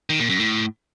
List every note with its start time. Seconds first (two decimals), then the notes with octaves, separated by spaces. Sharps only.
0.10 D#3
0.20 A#2
0.30 F#2
0.40 A2